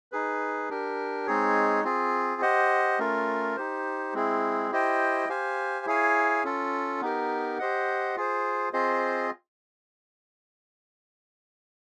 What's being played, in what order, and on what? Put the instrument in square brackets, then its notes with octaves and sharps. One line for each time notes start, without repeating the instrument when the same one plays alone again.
[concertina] D#4 G#4 B4
D4 G4 A#4
G#3 C4 D#4 G#4 C#5
C4 F4 G#4
G4 C5 D#5 F#5
A3 C#4 F4 A#4
D#4 G4 C5
G#3 C4 E4 G#4
E4 G4 C5 D#5 G5
G4 C5 F5 G#5
E4 G#4 C#5 F5 G#5
C#4 F4 A4
B3 D#4 G4 A#4
G4 C5 D#5 F#5
F4 G#4 C5
C4 F4 G#4 C5 D#5